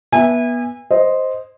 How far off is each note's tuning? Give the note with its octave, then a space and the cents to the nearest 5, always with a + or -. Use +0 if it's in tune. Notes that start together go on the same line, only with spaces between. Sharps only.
B3 -25 E5 +0 G#5 -30
C5 +0 D#5 +0